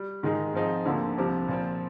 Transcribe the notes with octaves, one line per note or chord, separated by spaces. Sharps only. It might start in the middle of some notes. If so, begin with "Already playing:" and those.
Already playing: G3
G#2 D#3 G#3 D#4 G#4
G#2 F3 C4 D#4 G#4
D2 D3 F3 A#3
C2 C3 F3 C4 G4
A#2 F3 C4